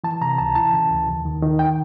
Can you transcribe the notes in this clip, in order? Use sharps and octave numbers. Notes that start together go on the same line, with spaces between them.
E3 A5
C3 A#5
C#2 A5
E3 A5
C#3
D2
D#2
D#3
D#3
G5